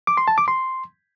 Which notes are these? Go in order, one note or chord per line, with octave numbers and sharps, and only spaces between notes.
D6
C6
A5
D6
C6